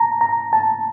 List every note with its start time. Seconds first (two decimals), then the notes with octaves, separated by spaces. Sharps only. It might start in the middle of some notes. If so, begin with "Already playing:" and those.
Already playing: A5 A#5
0.21 A#5
0.53 A5